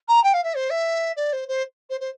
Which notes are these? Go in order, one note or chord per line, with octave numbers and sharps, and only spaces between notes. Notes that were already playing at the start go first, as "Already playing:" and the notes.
A#5
G5
F5
E5
C5
E5
D5
C5
C5
C5
C5